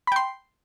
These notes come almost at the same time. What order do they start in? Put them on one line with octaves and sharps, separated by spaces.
B5 G5 C6